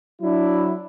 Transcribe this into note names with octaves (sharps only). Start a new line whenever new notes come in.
F#3 D4 E4